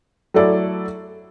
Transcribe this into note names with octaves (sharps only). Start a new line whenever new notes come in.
F#3 A3 E4 A4 D5